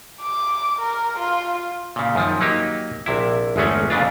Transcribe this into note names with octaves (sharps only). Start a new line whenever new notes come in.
D6
A#4
F4
A#2 C#3
F#2 D#3 F3
F#3 A#3 D#4 G4
A#1 C3 E4
G1 E2 G#3 A3 C#4
F2 A#2 C#3 D4 F4